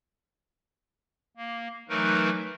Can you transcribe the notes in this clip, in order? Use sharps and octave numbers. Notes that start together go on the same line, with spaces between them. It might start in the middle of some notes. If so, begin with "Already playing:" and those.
A#3
E3 F#3 A3 D#4 A#4 B4